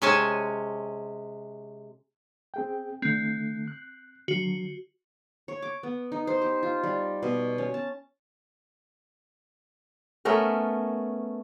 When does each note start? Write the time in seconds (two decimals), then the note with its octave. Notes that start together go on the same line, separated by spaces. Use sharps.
0.02 C3 G#3 C#4 C#5 G#5 A5
2.54 C4 G#4 G5
3.02 D3 A3 C4
3.68 F#6
4.28 D3 F#3 F#4
5.48 C#5
5.62 D6
5.83 B3
6.12 D#4
6.27 C5
6.42 G4
6.63 F4
6.83 G3
7.23 B2
7.58 C#4
7.74 A5
10.25 A3 B3 C#4 A#4